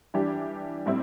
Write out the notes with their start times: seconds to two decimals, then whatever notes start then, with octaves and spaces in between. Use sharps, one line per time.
0.14 E3 G3 D4 G4
0.86 A2 G3 C4 E4